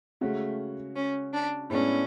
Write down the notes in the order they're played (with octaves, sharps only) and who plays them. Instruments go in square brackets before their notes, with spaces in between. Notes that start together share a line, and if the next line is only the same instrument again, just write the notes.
[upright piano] C#3 G#3 C#4 F#4 [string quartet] A3
[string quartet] C#4
D4
[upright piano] A2 G#3 B3 D4 [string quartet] C#4